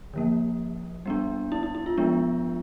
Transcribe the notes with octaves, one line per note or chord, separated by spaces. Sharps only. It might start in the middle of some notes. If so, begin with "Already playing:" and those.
D3 F3 A#3
G3 B3 D4
E4
E4
E4
F4
F3 G#3 B3 D4